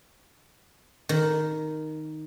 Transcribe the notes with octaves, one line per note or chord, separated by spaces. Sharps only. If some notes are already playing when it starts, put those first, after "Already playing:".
D#3